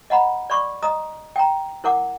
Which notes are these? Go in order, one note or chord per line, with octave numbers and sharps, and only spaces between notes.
D#5 F#5 A#5 B5
D5 B5 C#6 D6
D#5 A#5 D#6
G5 A#5
E4 A#4 F#5 D6